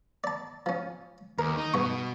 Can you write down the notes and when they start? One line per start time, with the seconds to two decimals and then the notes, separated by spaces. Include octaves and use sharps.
0.24 D5 A5
0.66 F3 C#4
1.39 D#2 A#4
1.57 D#4
1.74 G2 B2 C#6